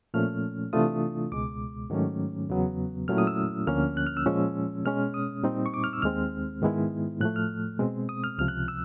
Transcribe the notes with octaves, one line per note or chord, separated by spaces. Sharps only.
A#2 F3 A3 C#4 F6
C3 E3 A3 D4 F4 D#6
C#2 B2 G#3 D6
G#2 D#3 F#3 A3 C#4
E2 C#3 F#3 B3
A#2 F#3 A3 C#4 E4 F6
D#6
E6
D2 D3 F3 A#3 C#4 F6
F#6
F6
E6
A#2 F3 G#3 C#4
B2 G#3 C#4 F6
D#6
A#2 G3 C4 D#4
C#6
D6
F6
E6
D#2 D#3 G#3 C4 F6
G#2 D#3 G#3 B3 E4
A2 F3 A3 F#6
F6
B2 G#3 C4
D#6
F6
C#2 C3 F3 F6
F#6
E6